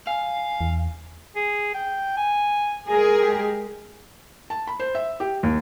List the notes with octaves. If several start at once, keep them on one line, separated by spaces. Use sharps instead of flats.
F5 G#5
E2
G#4
G5
G#5
G#3 G#4 A#4 G#5
G4
A5
B5
C5
E5
G4
D#2